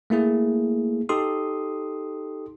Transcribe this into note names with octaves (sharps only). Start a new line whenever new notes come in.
A3 A#3 E4 G#4
D#4 G4 A4 C6 D#6